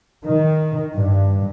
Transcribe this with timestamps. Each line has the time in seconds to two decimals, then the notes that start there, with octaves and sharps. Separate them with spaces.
0.25 D#3
0.97 G2